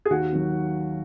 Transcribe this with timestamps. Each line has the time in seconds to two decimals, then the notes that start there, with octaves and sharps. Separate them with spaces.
0.05 G#4
0.10 D#2 F#4
0.33 D#3 F#3